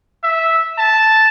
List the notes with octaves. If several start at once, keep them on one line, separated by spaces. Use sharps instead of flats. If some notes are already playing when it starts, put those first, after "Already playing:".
E5
A5